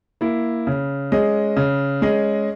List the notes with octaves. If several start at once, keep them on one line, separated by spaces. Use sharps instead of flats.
A#3 E4
C#3
G#3 C#4 G#4 D#5
C#3
G#3 C#4 G#4 D#5